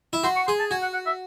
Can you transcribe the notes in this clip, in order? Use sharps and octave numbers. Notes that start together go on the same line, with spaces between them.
E4
F#4 C6
C#6
G#4 C6
A5
F#4 G#5
F#5
F#5
E5